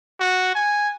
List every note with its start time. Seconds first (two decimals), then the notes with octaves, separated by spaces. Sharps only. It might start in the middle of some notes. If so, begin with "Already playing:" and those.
0.20 F#4
0.55 G#5